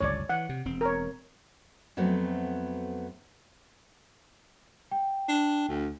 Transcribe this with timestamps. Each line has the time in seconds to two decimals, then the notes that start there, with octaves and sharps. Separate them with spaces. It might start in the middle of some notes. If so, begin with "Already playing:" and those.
0.01 G1 C#2 F#2 C#5 D5
0.29 E3 F#5
0.49 C3
0.65 E1 C4
0.81 A#4 C#5
1.97 F2 F#3 A3 B3 C4
4.91 G5
5.28 D4
5.68 D2